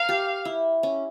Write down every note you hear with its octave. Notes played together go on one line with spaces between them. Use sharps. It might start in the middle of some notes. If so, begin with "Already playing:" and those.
Already playing: A#4 F5
G4
E4
C#4